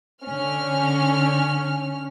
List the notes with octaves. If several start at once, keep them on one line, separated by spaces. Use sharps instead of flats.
D3 C#4 F6